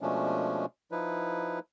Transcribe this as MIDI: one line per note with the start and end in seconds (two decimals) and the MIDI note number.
0.01 0.66 47
0.01 0.66 53
0.01 0.66 56
0.01 0.66 57
0.01 0.66 61
0.01 0.66 62
0.92 1.59 53
0.92 1.59 63
0.92 1.59 64
0.92 1.59 71